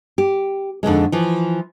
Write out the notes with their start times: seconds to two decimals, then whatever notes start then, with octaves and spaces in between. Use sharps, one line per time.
0.18 G4
0.83 F2 D3 D#3 G#3
1.12 E3 F3